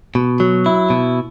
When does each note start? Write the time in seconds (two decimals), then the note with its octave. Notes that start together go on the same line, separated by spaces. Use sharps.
0.15 B2
0.40 F#3
0.66 E4
0.90 B2